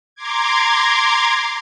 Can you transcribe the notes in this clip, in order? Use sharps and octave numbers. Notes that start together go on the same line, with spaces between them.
A#5 C6 D6 G#6